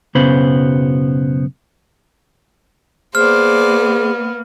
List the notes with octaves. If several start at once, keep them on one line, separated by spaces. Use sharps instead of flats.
B1 F#2 C#3 B3 C5 B5
A#3 B3 G#4 C5 D5 F6